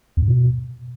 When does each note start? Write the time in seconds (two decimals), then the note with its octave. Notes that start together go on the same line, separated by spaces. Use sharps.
0.17 E2
0.22 G2
0.27 B2